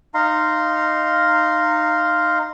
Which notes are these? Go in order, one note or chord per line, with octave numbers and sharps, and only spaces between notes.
D#4 F5 A#5 C6